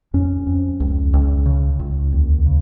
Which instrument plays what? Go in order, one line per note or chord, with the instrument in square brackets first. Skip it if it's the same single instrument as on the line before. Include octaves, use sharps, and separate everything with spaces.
[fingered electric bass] F2 C#4
F2
C#2
C#2
C#3
C#2
D#2
C#3